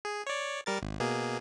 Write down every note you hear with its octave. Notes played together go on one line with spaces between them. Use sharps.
G#4
C#5 D5
G3 A#4 A6
G#1
B2 A#3 G#4